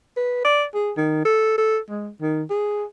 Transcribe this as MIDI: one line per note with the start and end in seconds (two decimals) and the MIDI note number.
0.17 0.44 71
0.45 0.64 74
0.74 0.92 68
0.97 1.20 51
1.25 1.53 69
1.58 1.78 69
1.89 2.09 56
2.22 2.43 51
2.50 2.84 68